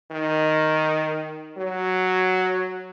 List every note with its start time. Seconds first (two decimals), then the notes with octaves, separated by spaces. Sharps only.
0.11 D#3
1.57 F#3